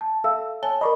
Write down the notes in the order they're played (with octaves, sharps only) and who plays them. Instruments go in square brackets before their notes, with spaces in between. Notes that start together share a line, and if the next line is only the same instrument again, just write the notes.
[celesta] A5
[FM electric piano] A4 [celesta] E5 F5 E6
[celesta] C#5 G#5 G7 [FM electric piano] A5
[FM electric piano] A#4 D5 D#5 [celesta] B5 C#6 D6